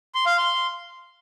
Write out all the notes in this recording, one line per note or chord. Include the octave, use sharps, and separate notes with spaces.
C6
F5
C6